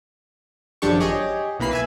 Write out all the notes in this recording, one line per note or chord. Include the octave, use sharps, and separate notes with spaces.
G#1 F#2 F3 D4 G4 C#6
G4 G#4 C#5 D#5
B1 E3 A#3 B5 C7
B4 E5 G#5